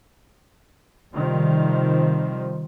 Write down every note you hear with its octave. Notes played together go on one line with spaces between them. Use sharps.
C3 D#3 F3 G3 C4